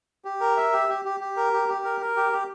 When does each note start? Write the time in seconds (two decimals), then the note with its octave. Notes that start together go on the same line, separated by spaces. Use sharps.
0.25 G4
0.41 A#4
0.57 E5
0.73 G4
0.89 G4
1.05 G4
1.20 G4
1.37 A#4
1.53 G4
1.69 G4
1.84 A#4
2.01 A#4
2.16 G4
2.32 G4